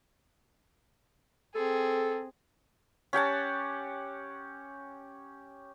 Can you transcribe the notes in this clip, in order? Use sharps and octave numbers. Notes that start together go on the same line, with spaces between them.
C4 G#4 A4
C#4 G4 F#5 A5